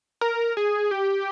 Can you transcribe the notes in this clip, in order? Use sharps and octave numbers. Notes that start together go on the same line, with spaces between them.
A#4
G#4
G4